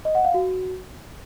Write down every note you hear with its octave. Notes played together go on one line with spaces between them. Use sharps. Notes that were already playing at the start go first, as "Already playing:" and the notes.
D#5
F#5
F5
F#4